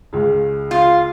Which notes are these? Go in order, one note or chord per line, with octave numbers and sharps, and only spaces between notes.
C#2 C#3
F4